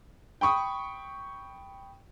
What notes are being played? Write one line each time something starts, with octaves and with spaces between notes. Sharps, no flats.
G5 B5 C#6 D#6